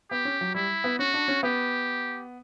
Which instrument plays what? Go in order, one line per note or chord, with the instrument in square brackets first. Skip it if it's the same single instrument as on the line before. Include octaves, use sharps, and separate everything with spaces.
[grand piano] B3 [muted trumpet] G4
[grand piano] C#4
F#3
[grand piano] G3 [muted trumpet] E4
[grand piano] B3
[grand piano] C#4 [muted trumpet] F#4
[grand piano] D4
C#4
[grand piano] B3 [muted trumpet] G4